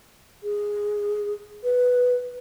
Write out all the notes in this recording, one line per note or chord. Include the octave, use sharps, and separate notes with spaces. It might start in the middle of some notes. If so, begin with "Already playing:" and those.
G#4
B4